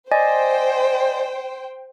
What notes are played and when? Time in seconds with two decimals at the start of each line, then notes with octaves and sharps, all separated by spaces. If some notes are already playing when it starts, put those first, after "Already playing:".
0.12 C5 D5 D#5 G5 G#5